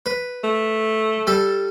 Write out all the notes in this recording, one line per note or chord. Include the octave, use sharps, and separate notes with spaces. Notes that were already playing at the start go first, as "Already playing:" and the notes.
B4
A3
G3 A4